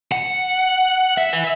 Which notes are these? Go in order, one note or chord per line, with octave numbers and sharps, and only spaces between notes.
F#5
E5
B4